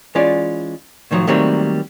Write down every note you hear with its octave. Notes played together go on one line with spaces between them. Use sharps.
E3 G#3 C#4 F4 D5
A2 D#3 F3 F#3
D#3 F#3 G3 A3 A#3 C4